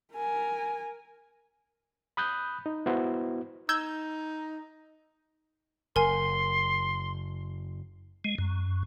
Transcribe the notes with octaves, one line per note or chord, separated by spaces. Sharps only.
A#4 G#5
B5 D#6 F#6 G6
D#4
B3 E4 F#4 C5
D#4 E6 G6 G#6
F#1 A#4 G#5 C6
G#3
F#2